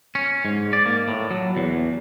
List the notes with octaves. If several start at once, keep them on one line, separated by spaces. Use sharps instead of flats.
C#4
G#2
D5
A#3
A2
F#3
E2